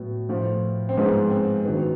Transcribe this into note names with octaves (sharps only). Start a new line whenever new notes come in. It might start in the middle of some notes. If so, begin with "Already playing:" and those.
Already playing: A2 F#3 B3
A2 F3
C4
G#2 F3 B3
C4
G2 D#3 F#3 B3
B3